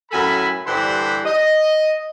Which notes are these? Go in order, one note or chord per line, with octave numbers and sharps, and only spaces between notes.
F#2 A2 A4 G#5 B5
G2 D3 E3 G3 C5 B5
D#5